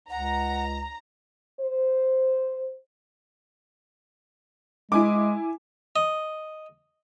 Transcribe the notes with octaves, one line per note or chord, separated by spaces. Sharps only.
C#2 F#5 A#5
C5
G#3 E4 G#5 D6
D#5